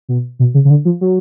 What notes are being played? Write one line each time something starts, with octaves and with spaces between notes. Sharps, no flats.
B2
B2
C#3
C#3
D3
F3
F#3